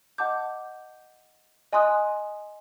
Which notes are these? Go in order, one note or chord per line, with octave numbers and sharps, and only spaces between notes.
D#5 F#5 A5 D6 G6
D#5 G#5 C6 D#6 F#6